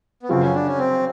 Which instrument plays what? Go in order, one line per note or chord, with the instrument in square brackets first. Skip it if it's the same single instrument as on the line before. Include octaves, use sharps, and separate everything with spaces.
[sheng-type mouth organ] B3
[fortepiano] F#2 C#3 F3 [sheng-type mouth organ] C4
[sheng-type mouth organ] C#4
D4
C#4
C4